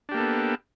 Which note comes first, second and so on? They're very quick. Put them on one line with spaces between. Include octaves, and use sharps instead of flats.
D4 G4 A#3 A4 B3